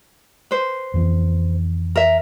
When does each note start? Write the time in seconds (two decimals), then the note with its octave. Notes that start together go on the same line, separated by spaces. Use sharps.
0.51 B4 C5
0.94 F2 E3
1.96 A#4 E5